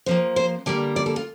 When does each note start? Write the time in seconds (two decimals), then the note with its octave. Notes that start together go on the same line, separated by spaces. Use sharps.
0.06 C3 F3 A#3 C5
0.36 C5
0.66 D3 G3 A#3 D5
0.96 D5
1.06 A4
1.16 F4